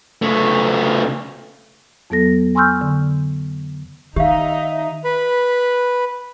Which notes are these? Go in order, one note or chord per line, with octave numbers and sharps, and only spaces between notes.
C#3 A3
F2 F#3 B3 A4 A#6
G#5 C6 C#6 E6 F6 G6
D3
D#3 D#4 G4 E5 F5
B4 B5